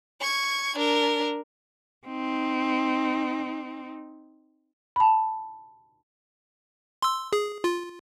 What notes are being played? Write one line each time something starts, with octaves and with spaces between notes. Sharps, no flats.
C#6 G#6
D4 A#4
C4 D#4
A5 B5
C6 E6
G#4
F4